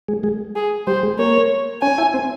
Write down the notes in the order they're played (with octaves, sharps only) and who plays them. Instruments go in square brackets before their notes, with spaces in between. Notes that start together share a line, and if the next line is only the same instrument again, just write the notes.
[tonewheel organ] G#3 G#4
G#3 G#4
[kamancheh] G#4
[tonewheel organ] G3 G4 [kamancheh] C5
[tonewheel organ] G#3 G#4
[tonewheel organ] A#3 A#4 [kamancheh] C#5
[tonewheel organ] C#4 C#5 [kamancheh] G#5
[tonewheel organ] E4 E5
C4 C5